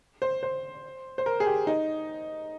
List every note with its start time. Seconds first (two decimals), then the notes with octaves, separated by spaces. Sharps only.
0.22 C5
0.43 C5
1.18 C5
1.26 A#4
1.40 G#4
1.47 G4
1.67 D#4